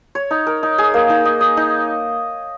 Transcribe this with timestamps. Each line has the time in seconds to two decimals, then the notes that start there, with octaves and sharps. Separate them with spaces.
0.15 C#5
0.31 D#4
0.47 A#4
0.63 D#4
0.78 G#4
0.94 A#3
1.10 D#4
1.25 D#5
1.41 D#5
1.57 D#4